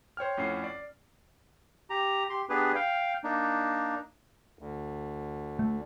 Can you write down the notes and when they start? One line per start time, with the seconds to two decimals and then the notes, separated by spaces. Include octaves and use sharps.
0.17 C5 C#5 G5 F6
0.37 F2 A2 C#4 F#5 C7
0.64 D5
1.90 G4 A#5
2.30 G4 C6
2.49 B3 D4 G4 G#4 B4
2.75 F5 G5
3.24 A#3 D4 D#4
4.59 D2
5.59 A3